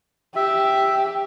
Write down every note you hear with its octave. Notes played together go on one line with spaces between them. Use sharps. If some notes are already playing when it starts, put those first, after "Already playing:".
G4 E5